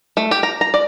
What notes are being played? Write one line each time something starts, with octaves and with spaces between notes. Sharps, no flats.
A3
G4
A#5
A#5
D5